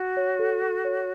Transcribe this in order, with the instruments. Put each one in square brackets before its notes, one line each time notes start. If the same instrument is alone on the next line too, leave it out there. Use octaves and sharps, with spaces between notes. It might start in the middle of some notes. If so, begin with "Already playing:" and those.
Already playing: [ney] F#4 [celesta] F#5
[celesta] C#5
A4
A4
C#5